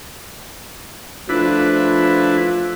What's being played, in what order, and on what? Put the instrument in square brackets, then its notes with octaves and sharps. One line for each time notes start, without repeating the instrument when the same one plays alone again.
[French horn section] F3 A3 F4 [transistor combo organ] D4 E4 B4